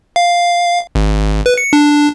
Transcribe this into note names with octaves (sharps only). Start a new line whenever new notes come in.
F5
G#1
B4
C#7
D4